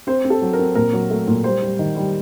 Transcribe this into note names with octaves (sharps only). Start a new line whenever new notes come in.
C4 C5
C4
A4
F#3
A#4
C4
A#2 A#4
F#3
A3
A#2
G3 C5
G3
D#3
G3